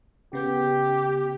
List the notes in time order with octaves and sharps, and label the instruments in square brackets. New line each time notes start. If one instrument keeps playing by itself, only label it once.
[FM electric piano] C#3 B3 G6 [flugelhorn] G4